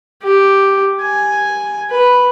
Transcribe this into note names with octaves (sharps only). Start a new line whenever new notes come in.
G4
G#5
B4